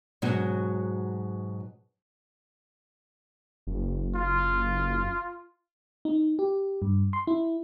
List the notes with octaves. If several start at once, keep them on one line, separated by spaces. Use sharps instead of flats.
G#2 B2 F#3 C#4 F#4 C#5
F#1
F4
D#4
G4
G2
C6
E4